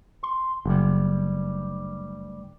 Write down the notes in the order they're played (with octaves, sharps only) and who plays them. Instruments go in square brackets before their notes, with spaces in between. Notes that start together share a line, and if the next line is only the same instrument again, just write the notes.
[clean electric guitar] C6
[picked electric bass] F#1 [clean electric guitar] D2 G2 G3